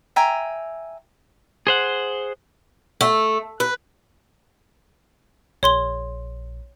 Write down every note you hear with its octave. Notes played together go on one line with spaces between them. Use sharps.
E5 G5 G#5 A#5
G#4 C5 F#5
A3
B4
A#1 C#5 C6 G7